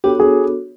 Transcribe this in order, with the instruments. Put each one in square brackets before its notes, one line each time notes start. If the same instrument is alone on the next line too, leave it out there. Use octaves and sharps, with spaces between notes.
[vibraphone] B3 D4 F#4 A4 C#5 [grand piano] G4
[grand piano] G#4